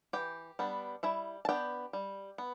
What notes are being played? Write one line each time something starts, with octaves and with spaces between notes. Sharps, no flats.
E3 G4 G5
G3 B3 D4
G3 E4 E5
A5
B3 D4 G4 G5
G3
B3